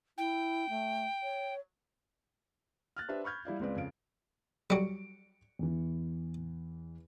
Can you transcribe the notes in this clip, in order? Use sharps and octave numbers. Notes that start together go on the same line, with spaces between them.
E4 G5
A3
C#5
F6 F#6 A6
D4 G4 B4 C5 E5
B5 C#6 F6 G6 G#6
G3 E4 D5 F5
C#2 G#3 C4 B4 D5
F2 C#3 F5 D7
F#3 G3 C#7 D7
E2 E3